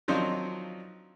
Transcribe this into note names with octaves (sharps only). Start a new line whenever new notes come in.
D#3 F3 F#3 C4 D4 D#4